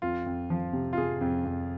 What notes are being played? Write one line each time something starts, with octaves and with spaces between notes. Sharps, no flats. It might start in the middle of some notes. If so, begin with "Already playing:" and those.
F2 F4
F2
F3
C3
F4
C3 G#4
F2
F2